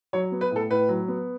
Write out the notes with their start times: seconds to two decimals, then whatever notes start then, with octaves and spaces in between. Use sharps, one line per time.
0.13 F#3 C#5
0.32 B3
0.41 B4
0.51 A2 A4
0.70 A2 B4
0.88 F#3
1.08 B3